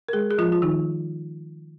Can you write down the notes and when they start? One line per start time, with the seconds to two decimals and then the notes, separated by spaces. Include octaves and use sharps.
0.09 A#4
0.13 G#3 G#4
0.31 G#4
0.38 F3 F4
0.52 F4
0.62 D#3 D#4